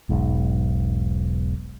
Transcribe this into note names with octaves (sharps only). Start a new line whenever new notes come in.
E1 B1 G#2